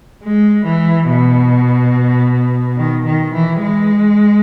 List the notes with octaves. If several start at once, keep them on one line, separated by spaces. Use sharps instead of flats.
G#3
E3
B2
D#3
D#3
E3
G#3